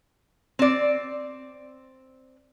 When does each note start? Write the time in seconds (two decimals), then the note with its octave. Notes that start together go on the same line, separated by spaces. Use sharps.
0.59 C4 D5